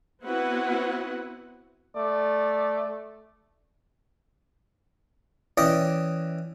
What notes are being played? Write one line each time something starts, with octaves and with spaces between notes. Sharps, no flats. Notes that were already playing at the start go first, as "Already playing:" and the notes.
B3 C4 E4 F#4 B4 F#5
A3 D5
E3 C#4 D5 D#5 G5 C#6